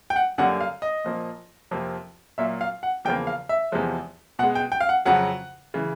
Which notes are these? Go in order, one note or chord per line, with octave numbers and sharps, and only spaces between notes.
G5
F#5
F#2 D3 G3 A#3 F#5
F5
D#5
A#2 F3 A#3
F2 C3 F3 A#3
A#2 F#3 A#3 E5
F5
F#5
E2 C#3 F3 A#3 G5
F5
E5
E2 C3 F3 G#3
B2 G#3 F#5
G5
G5
F5
F#5
F2 C#3 F#3 F#5
C#3 E3